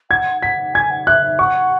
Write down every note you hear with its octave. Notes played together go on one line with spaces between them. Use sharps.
F#5 G#6
F#5 B6
G#5 G#6
F#5
E5 F#6
E5
F#5 C#6